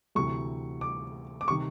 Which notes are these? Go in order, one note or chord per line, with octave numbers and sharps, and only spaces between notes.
D2 C3 E3 C#6
D6
D6
C3 D#3 C#6